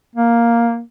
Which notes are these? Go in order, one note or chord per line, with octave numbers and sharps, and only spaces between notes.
A#3